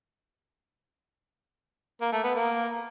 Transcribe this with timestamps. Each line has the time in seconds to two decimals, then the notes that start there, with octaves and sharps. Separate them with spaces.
2.01 A#3
2.12 A3
2.24 B3
2.35 A#3